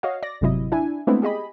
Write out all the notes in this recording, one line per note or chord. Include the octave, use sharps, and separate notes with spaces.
F#4 C#5 D#5 F5
D5 A#6
G1 G#2 C3 F#3 E4 D#5
D4 E4 G#5
G#3 A3 B3 C4 D4 E4
G4 G#4 D#5 B5